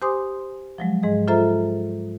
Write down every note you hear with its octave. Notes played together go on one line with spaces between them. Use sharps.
G4 C5 G#5 C6 D6 D#6
F3 F#3 G#3
G#2 G#3 G#4 D#5
F4 A4 C5 E5 A#5